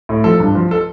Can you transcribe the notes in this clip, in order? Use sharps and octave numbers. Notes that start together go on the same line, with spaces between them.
A2
F3 A4
G2
F3
A4